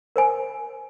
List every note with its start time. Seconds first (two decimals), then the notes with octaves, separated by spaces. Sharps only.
0.16 A#4 C5 G#5